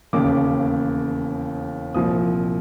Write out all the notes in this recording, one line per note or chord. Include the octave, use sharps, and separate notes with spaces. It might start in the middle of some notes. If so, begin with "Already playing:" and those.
E1 D#2 C#3 D6
C2 A#2 F3 D#6